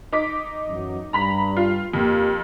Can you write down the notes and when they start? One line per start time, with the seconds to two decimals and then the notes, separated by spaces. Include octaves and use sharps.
0.13 D#4 D6 B6
0.69 F#2 E3 F#3
1.13 G2 A#5 B5 B6
1.57 F4
1.94 F2 A#3 G4